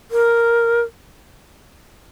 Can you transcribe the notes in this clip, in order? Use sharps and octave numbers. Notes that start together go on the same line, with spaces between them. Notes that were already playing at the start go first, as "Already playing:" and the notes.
A#4